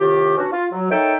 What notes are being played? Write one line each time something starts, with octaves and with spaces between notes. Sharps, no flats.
A2 C3 D#3 F4 G4
B2 C#4 D4 F#4
F4
F#3
A#3 D#4 A4 C#5 E5 G5